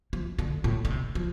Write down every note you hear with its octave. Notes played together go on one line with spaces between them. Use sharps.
F3
D3
A2
D3
C3
F3